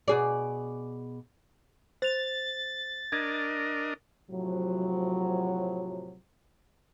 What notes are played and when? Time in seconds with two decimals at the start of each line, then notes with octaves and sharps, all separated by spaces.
0.08 B2 G#4 D5
2.02 C5 A6 F7
3.12 D4 A#4 D#5 G#6
4.31 A2 C3 F3 F#3